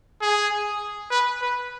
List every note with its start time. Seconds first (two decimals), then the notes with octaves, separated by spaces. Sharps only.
0.22 G#4
1.11 B4
1.41 B4